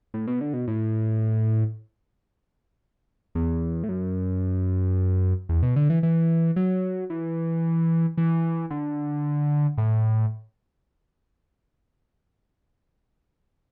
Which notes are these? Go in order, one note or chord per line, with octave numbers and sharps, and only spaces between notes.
A2
B2
D3
B2
A2
E2
A2
F#2
E2
B2
D3
E3
E3
F#3
E3
E3
D3
A2